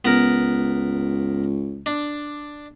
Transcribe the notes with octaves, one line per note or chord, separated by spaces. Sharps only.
C#2 B3 A#4
D4